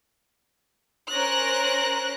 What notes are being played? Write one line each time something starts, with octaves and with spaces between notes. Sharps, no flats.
C#4 A#4 C5 F#6 A#6